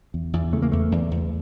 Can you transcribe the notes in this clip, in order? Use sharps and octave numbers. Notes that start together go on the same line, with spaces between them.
E2
E2
C#3 A3
A#3
E2 A3
E2
E2